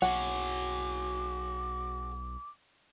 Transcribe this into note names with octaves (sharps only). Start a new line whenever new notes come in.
B1 F#4 G#4 C#5 F#5 D6